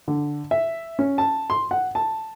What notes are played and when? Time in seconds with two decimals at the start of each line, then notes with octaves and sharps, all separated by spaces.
0.08 D3
0.51 E5
0.99 C#4
1.18 A5
1.50 C6
1.71 F#5
1.95 A5